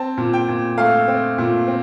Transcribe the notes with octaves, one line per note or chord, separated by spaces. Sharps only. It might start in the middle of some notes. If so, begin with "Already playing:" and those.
Already playing: C4 A5
A#2
G5
A#2
A3 F5
C4
A#2
C4